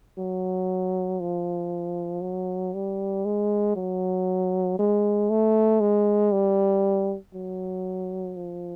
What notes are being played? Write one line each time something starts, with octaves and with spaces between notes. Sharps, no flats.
F#3
F3
F#3
G3
G#3
F#3
G#3
A3
G#3
G3
F#3
F3